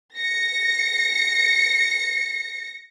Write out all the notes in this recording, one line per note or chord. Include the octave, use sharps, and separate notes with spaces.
A#6 C#7